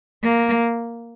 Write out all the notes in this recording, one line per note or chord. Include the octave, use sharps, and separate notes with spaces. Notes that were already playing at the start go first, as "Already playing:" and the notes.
A#3